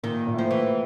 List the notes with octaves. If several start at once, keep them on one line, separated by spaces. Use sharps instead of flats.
A#2 D#3
A#2
A2
F3
E3